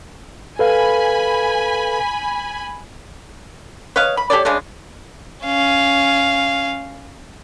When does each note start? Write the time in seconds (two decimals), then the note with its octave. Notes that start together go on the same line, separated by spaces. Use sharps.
0.59 A4 B4 F5 G#5 B5
3.96 B4 C#5 D#5 F5
4.17 B5
4.30 G4 A4 C#5 D5
4.45 C#3 G#3 C#4 D4
5.45 C#4 F5